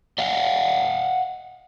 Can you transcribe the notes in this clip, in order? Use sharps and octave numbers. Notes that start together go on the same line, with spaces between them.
D#5 F5 F#5